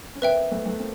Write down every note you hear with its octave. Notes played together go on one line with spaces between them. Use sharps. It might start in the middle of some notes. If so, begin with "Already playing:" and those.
C#4
A#3 C4 B4 E5 G5
A3 B3
A3 B3
A#3 C4